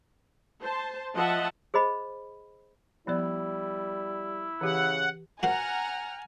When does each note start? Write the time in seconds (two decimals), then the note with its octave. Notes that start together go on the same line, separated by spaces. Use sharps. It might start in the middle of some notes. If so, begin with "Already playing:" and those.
0.61 C5 A5
1.15 F3 D#5 E5 F#5 A5
1.74 G#4 C5 D#5 B5
3.07 F3 G3 B3 E4 D5
4.61 C#3 E3 G4 F#5
5.43 F#4 A#4 C5 F#5 G#5 A#5 F6